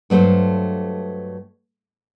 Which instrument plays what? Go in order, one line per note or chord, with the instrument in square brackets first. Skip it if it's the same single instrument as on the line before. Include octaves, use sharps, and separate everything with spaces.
[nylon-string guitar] G2 F#3 A3 C5 F5